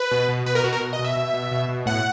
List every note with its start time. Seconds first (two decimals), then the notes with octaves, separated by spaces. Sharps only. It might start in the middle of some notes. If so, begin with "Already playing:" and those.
Already playing: B4
0.11 B2
0.29 B2
0.46 B2 B4
0.55 A#4
0.64 B2 F#4
0.73 A#4
0.81 B2
0.93 D#5
0.99 B2
1.04 E5
1.16 B2
1.34 B2
1.52 B2
1.69 B2
1.86 A2 F#5